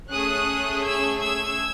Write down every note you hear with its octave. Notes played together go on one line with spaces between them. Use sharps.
A3 C#4 G#4 D#6 F#6
E6 G#6
E6 G#6